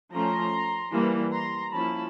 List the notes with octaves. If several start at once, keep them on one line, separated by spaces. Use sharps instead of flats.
F3 A3 C#4 A#5 C6
E3 G3 A#3
A#5 C6
F3 A#3 C#4 E4 A5 B5